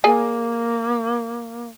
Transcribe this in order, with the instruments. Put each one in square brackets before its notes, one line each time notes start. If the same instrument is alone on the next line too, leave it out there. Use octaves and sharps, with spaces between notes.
[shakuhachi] A#3 [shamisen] G#4 D5 G#5